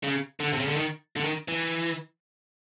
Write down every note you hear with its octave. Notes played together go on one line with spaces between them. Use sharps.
C#3
D3
C3
C#3
D3
D#3
D3
D#3
E3